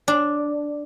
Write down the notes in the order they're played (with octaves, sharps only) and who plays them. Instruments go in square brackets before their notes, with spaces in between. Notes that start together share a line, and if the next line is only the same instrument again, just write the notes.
[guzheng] D4